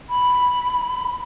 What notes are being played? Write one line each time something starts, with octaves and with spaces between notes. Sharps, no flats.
B5